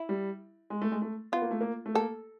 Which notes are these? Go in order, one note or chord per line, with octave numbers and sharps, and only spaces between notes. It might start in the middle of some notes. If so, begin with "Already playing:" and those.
Already playing: E4
G3
G#3
A3
G#3
A3
B3 F4
A#3
A3
A#3
A3
A#3 A4